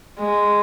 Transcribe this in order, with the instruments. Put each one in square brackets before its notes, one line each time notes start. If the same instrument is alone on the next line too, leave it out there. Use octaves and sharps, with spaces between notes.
[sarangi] G#3